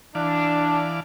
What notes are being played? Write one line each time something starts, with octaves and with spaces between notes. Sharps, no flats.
E3 D4 D5 F5